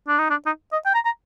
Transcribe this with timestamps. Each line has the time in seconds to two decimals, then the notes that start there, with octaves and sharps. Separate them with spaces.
0.08 D4
0.19 D#4
0.30 D4
0.46 D#4
0.72 D#5
0.86 G5
0.94 A#5
1.05 A#5